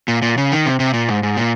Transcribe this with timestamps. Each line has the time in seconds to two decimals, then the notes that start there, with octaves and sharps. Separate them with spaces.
0.08 A#2
0.22 A#2
0.38 C#3
0.52 D#3
0.66 C3
0.80 C3
0.94 A#2
1.09 G#2
1.23 G#2
1.37 A#2